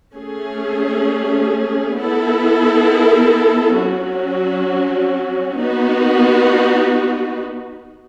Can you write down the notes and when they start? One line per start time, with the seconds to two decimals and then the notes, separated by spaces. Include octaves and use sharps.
0.14 A3 C#4 G#4
1.96 B3 E4 A4
3.76 F#3 C#4 F#4
5.59 B3 D#4 F#4 B4